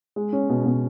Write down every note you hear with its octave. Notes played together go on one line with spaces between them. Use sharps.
G#3
C#4
B2
B2